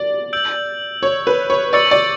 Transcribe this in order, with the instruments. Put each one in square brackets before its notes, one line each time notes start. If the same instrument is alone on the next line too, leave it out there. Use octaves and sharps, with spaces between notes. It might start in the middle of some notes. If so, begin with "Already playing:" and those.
Already playing: [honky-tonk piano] D5
[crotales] E6 G6 D7 F#7
[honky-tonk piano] C#5
B4
C#5
[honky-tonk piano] D5 [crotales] C#6 E6 A6 C#7 F#7
[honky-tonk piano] D5